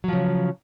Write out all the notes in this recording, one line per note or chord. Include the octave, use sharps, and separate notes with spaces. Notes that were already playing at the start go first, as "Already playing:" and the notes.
C#3 F3 F#3